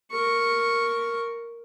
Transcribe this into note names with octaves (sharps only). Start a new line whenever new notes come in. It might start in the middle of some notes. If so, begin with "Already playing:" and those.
A#4 C#6